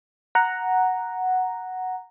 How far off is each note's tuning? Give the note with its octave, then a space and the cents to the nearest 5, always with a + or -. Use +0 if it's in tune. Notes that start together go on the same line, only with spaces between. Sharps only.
F#5 +0 A#5 +0